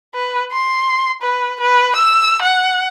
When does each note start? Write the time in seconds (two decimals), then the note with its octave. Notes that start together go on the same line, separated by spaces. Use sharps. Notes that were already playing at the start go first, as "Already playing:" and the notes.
0.14 B4
0.52 C6
1.22 B4
1.60 B4
1.96 E6
2.42 F#5